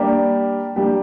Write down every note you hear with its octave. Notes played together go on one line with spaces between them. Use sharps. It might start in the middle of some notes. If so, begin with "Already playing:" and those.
Already playing: G3 A#3 D4 G4
G3 A#3 D4 G4